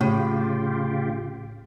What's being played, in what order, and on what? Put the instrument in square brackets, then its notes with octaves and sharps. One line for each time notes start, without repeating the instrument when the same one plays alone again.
[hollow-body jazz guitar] A2 [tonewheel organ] C#3 F4 G4